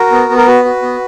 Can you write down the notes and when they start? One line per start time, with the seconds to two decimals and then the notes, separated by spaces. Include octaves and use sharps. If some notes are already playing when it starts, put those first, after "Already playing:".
Already playing: F#4 A#4
0.12 B3
0.29 B3
0.37 A#4
0.47 F#4 B4
0.65 F#4
0.82 B3